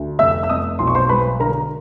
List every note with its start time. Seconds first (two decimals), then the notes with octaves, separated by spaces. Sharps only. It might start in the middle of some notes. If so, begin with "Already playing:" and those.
Already playing: D2
0.19 F1 E5 E6
0.43 E6
0.49 F1 D#5 D#6
0.79 B1 C6
0.87 C#6
0.95 C5 C6
1.09 G#3 B4 B5
1.40 D3 A#4 A#5